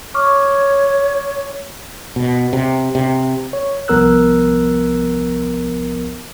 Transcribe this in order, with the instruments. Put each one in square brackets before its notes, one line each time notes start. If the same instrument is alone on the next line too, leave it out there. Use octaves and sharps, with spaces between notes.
[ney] C#5 [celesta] C#6 D6 F6
[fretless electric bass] B2
C3
C3
[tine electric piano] C#5
C2 F3 B3 A#4 E6 F#6